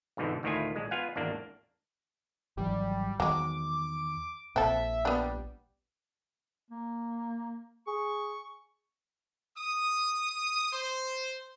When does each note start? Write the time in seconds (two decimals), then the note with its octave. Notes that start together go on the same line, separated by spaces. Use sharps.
0.17 F2 G#2 B2 D3 E3
0.43 D2 A2 D#3 E4 F4 G#5
0.76 A#1 G#3
0.91 B3 F4 F5 F#5 G#5
1.16 G#1 E2 A#3 D4
2.57 G#1 E3 F#3 G3
3.20 E2 D#3 F#3 G#3 D6
4.56 A#1 A#2 C4 A4 E5
5.05 G3 B3 D4
6.70 A#3
7.87 G#4 C#6
9.57 D#6
10.72 C5